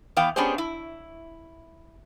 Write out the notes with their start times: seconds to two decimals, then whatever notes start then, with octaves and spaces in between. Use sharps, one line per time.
0.17 E3 B3 F5 G5
0.36 B3 C#4 D4 G4 G#4 C5
0.58 E4